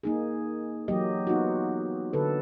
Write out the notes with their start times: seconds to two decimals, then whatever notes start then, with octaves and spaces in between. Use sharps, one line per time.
0.03 A#3 D#4 G#4
0.88 E3 F#3 A#3 G4 D#5
1.27 B3 D#4 F4 F#4
2.13 D3 A4 B4